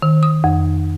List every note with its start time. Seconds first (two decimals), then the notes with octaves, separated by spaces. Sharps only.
0.02 D#3
0.23 D#6
0.44 F2